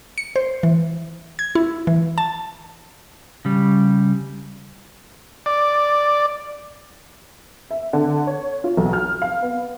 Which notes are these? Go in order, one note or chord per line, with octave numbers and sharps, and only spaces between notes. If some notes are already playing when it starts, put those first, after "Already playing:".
C#7
C5
E3
G#6
E4
E3
A5
C#3 G3
D5
E5
D3
C#5
F4
B1
F6
F5
B3